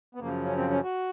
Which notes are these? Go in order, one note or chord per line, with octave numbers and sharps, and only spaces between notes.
B3
F#2 C#3 F3 A#3
C#4
C4
C#4
F#4